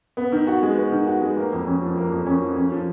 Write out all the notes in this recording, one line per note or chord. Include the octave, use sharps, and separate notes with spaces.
B3
D#3
F#4
G#3
B3
D#3
F#4
G#3
A#3
F2
C#4
F3
A#3
F2
C#4
F3
C#4
F3